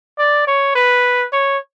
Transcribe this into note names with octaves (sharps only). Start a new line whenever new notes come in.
D5
C#5
B4
C#5